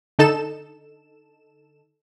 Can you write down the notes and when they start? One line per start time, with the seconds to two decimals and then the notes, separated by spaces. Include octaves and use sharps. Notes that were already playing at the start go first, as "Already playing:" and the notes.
0.19 D3 D#4 A4 E7